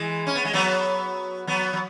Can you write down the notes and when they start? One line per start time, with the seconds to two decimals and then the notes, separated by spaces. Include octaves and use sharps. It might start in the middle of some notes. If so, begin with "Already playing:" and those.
Already playing: E3 G#3
0.27 C#4
0.35 B3
0.45 G#3
0.53 F#3 B3
1.47 F#3 B3
1.73 F#3